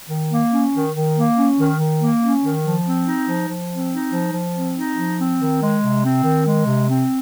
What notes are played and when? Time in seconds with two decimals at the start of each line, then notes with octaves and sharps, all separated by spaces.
0.09 D#3
0.30 A#3
0.51 C#4
0.72 D#3
0.94 D#3
1.15 A#3
1.37 C#4
1.58 D#3
1.79 D#3
2.00 A#3
2.21 C#4
2.42 D#3
2.64 F3
2.85 C4
3.06 D#4
3.27 F3
3.48 F3
3.70 C4
3.91 D#4
4.12 F3
4.33 F3
4.55 C4
4.75 D#4
4.97 F3
5.18 C4
5.39 D#3
5.61 G#3
5.82 C3
6.03 C4
6.24 D#3
6.45 G#3
6.67 C3
6.87 C4